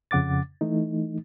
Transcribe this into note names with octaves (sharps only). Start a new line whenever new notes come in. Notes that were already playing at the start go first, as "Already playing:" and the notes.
F2 C#3 F#5 D6 A6
E3 A3 D#4